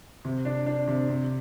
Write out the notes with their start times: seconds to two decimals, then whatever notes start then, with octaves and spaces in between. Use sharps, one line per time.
0.25 C3
0.45 D4
0.66 D4
0.88 C3
1.09 C3